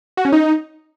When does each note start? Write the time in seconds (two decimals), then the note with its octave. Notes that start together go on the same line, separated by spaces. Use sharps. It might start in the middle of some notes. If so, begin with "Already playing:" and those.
0.17 F#4
0.25 C#4
0.32 D#4